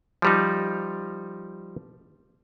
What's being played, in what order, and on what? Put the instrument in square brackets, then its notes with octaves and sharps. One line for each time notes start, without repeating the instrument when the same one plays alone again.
[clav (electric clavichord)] F3 G3 D#4